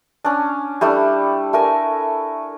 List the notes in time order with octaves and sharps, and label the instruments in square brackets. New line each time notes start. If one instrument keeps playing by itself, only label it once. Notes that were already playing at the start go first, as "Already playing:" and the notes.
[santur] C#4 D4
G3 A3 D4 E4
A3 A#4 G#5